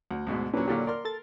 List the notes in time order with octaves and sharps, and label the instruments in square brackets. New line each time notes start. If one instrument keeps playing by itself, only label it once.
[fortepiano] D2
D2 G#2 B2
[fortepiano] A#2 F#3 [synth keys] C#4 D4 B4
[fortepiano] A#2 D3 F#3 [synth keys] G4 D5 F5
[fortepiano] A#4 C6 F6 [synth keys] D5
[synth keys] A4 A6